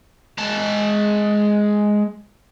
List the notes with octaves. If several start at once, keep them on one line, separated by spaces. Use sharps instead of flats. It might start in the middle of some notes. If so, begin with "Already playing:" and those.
G#3 A5